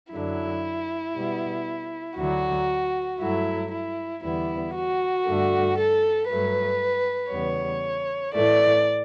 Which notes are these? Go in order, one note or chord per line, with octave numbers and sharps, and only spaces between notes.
F#2 D3 F#3 E4
B2 G3 B3
D2 D3 F#3 F#4
G2 F#3 A3 E4
E4
E2 D3 G3 B3 E4
F#4
G2 D3 A3
A4
G2 F#3 A3 B4
E2 C#3 G3 B3 C#5
A2 E3 A3 D5